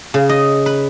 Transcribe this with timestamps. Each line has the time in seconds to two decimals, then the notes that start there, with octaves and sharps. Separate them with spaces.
0.14 C#3
0.29 D#5
0.66 B4